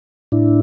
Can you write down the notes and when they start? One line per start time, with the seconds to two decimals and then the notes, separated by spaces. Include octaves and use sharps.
0.32 A2 D4 E4